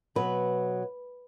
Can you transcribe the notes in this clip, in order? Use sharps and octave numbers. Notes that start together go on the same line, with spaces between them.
B2 F#3 B3 B4